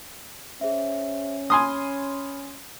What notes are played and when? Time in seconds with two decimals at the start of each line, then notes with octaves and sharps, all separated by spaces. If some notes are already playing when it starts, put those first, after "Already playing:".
0.61 C#4 G#4 C5 E5
1.50 G#5 B5 C6 D#6 F6